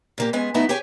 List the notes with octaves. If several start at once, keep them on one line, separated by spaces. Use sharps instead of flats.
A#2 A#3 G4
G#3 B3 C#4 G#5
F#3 A3 B3 D#4 E4
G4 G#4 C#5 G5 G#5